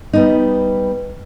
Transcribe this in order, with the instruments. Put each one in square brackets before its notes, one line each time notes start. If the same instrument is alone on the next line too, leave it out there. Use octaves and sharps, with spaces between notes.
[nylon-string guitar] G3 B3 D#4